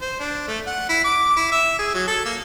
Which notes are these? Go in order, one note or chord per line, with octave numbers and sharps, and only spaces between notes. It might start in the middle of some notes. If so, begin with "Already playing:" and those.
C5
D4
A3
F#5
E4
D6
E4
E5
G#4
F#3
A4
A#3